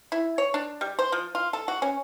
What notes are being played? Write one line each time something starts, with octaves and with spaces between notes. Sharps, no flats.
E4
C#5
D4
G3
C5
F3
F4
A4
F#4
C#4